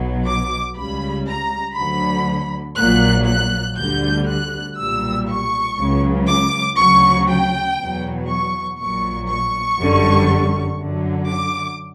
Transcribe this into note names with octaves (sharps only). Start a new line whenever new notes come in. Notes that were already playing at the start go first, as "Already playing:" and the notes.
Already playing: B1 B2 F#3
D6
C#2 C#3 G3 B5
A#5
D2 D3 F#3 B5
A#1 A#2 F#3 F#6
F#6
D2 D3 G3 G6
F#6
B1 A#2 G3 E6
C#6
C#2 C#3 F#3
D6
D2 C#3 F#3 C#6
G5
E2 B2 F#3
C#6
A#1 A#2 F#3 C#6
C#6
G1 F#2 D3 G3
F#2 D3 F#3
D6